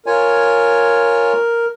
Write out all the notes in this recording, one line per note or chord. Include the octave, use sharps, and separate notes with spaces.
F4 A#4 C#5 G#5